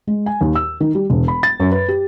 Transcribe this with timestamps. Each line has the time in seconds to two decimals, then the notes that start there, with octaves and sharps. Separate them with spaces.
0.07 G#3
0.26 G#5
0.41 D#2
0.56 E6
0.80 D#3
0.95 G3
1.10 E1
1.28 B5
1.43 A6
1.60 F#2
1.71 B4
1.89 G4